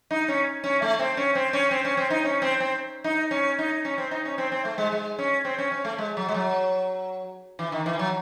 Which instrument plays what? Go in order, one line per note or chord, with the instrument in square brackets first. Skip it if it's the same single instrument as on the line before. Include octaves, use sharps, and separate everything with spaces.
[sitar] D#4
C#4
C#4
A3
C4
C#4
C4
C#4
C4
C#4
C4
D#4
C#4
C4
C4
D#4
C#4
D#4
C#4
C4
D#4
C#4
C4
C4
A3
G#3
G#3
C#4
C4
C#4
C#4
A3
G#3
F#3
G#3
F#3
E3
D#3
E3
F#3